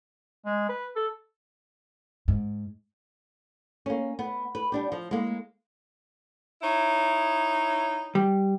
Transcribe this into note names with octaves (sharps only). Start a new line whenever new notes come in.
G#3
B4
A4
G#2
A#3 C#4
B3
B4
G3 D4 G4
F3
G#3 A#3
D#4 E4 C#5
G3